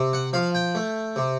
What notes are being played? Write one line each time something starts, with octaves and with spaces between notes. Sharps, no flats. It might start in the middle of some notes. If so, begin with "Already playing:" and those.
Already playing: C3
F#5
F3 F5
G5
A3
C3